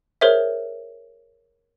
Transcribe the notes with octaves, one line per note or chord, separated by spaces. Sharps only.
G#4 A#4 C5 C#5 E5